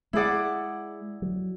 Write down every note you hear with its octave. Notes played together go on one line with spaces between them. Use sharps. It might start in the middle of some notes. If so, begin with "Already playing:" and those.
G#3 E4 G#4 D5 F#5
F#3